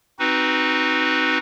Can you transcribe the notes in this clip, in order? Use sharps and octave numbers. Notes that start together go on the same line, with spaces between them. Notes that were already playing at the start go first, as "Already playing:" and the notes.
C4 D#4 F#4 B4